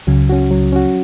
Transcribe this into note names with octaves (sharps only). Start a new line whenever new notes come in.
C#2 C#3 F#3
C#4 F#4
F#3
C#4 F#4